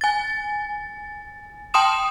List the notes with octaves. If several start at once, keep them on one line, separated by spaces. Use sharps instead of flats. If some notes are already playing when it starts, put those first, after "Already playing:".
G#5 A6
G5 A5 C6 D#6 E7